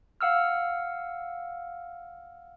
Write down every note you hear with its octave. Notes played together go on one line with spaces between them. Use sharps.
F5 F#5 E6 F6